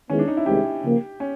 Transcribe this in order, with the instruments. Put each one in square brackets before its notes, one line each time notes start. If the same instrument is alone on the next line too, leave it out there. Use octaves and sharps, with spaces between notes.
[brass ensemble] D#3 G#3 B3 E4 G#4 [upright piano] C#4
[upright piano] D4
D#4
E4
[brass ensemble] C2 C3 D#3 G#3 [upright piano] G4
[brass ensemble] C#3 F3 A#3
[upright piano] C#4